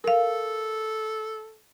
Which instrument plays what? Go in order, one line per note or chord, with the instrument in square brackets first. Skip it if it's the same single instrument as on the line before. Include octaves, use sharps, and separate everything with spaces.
[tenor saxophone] A4 [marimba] A#4 F5